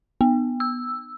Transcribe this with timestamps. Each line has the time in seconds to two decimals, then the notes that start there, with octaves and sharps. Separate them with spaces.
0.21 B3
0.60 E6